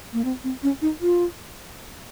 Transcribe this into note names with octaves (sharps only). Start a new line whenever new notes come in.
A#3
C4
C4
C#4
D#4
F4